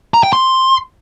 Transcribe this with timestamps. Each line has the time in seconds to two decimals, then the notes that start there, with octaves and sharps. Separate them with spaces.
0.14 A#5
0.23 G5
0.33 C6